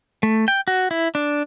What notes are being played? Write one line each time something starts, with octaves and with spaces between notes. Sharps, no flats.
A3
G5
F#4
E4
D4